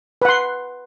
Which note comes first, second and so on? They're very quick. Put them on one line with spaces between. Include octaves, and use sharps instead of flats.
B4 F#5 C6